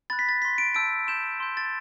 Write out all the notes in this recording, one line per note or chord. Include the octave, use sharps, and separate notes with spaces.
B5 F#6 A6
B6
A6
C6 F#6 B6
D7
A5 E6 G6 D7
C6 G6 E7
C6 G6
A6